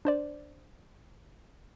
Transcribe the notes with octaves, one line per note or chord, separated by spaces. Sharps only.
D4 C5 D5